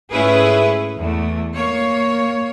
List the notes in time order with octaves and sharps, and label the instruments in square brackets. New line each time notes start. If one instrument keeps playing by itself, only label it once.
[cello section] G#2 A3 C#4 E4 G#4 B4
E2 A3
A#3 C#5